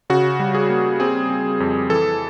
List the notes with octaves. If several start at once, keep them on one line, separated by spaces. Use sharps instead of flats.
C#3 F#4
G3
G#4
A#3
C4 G#4
C4
F2
E3 A4